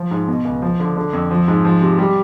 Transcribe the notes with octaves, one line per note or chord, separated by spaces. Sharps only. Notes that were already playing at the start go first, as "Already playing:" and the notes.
Already playing: F3
G#2
B2
C#2
F3
D3
D3
F2
F3
G#2
F3
C3
G3